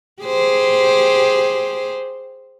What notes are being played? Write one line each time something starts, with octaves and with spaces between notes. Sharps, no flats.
G4 G#4 C5